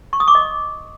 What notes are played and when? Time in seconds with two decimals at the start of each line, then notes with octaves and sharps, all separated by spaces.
0.13 C#6
0.20 D#6
0.28 D6
0.35 D#5